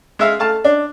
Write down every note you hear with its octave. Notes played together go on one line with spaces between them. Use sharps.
G#3 E5 F5
A3 F5 A5
D4